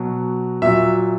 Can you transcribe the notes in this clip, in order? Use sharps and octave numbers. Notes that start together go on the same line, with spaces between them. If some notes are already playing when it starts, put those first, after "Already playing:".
Already playing: B2 F#3
A#2 F#3 E5